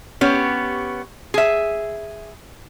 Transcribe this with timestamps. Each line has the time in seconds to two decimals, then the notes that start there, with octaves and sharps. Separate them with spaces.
0.21 B3 C#4 G4
1.34 G#4 E5